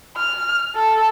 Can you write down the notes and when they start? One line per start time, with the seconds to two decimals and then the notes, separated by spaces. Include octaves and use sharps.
0.17 F6
0.75 A4